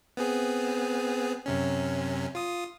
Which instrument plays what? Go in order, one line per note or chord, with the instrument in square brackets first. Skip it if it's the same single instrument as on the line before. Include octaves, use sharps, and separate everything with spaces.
[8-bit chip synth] B3 C4 G#4
F#2 C3 C#4
F4 D#6